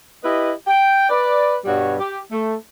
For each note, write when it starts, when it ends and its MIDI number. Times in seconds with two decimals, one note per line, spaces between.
0.24 0.52 64
0.24 0.52 67
0.24 0.52 71
0.24 0.52 75
0.67 1.06 79
1.10 1.56 71
1.10 1.56 74
1.65 1.95 43
1.65 1.95 47
1.65 1.95 55
1.65 1.95 66
1.65 1.95 73
2.00 2.19 67
2.32 2.56 57